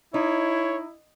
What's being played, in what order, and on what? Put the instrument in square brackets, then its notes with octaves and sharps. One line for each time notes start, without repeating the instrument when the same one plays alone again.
[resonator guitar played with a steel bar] D#4 [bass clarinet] E4 [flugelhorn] C#5